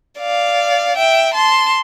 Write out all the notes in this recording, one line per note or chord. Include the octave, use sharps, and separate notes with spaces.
D5 F5
E5 G5
A5 C6